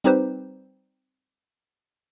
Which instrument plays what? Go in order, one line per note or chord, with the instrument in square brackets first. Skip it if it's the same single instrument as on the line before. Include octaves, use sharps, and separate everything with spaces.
[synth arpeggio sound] G3 C4 D#4 G4 B4 C5